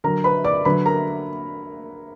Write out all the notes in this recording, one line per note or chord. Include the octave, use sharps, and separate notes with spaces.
D3 F#3 A#4 A#5
B4 B5
D5 D6
D3 F#3 B4 B5
A#4 A#5